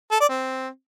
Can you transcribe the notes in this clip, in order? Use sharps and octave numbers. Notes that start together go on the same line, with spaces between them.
A4
D5
C4